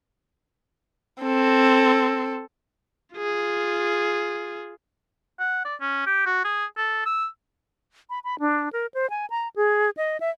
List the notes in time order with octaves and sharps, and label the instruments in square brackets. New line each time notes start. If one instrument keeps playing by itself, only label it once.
[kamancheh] C4 A4
[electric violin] F4 G#4
[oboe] F#5
D5
C#4
G4
F#4
G#4
A4
E6
[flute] B5
B5
D4
A#4
C5
G#5
A#5
G#4
D#5
E5